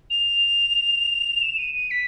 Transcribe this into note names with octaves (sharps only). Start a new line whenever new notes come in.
F7
E7
D#7
D#7
B6